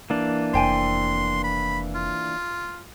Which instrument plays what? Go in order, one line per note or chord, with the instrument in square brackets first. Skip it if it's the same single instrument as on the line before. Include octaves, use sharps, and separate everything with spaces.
[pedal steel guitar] E3 A#3 D4
[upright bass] F1 F2 [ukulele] C5 G5 G#5 [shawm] C6
[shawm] B5
F4